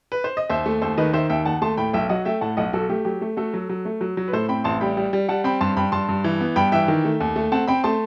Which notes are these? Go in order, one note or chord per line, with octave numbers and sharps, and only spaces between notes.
B4
C5
D#5
D#2 C5 E5
A3
D#2 A4 C5
D#3 B4 D#5
D#3 C5 E5
D#2 E5 G5
D#2 F#5 A5
A3 A5 C6
A2 G5 B5
B1 E5 G5
F#3 D#5 F#5
A3 E5 G5
A2 F#5 A5
B1 D#5 F#5
B1 F#4 A4
A3 G4
F#3 G4
A3
A3 F#4 A4
F#3
F#3
A3
F#3
F#3
B4
A2 A4 C5
C4 G5 B5
A1 A5 C6
G3 G5 B5
G3
G3
G3 F#5 A5
C4 G5 B5
G2 A5 C6
G2 G5 B5
G2 A5 C6
G2
E3
B3
G2 G5 B5
E3 E5 G5
D#3
A3
D#2
A3
C4 F#5 A5
C4 G5 B5
A3 A5 C6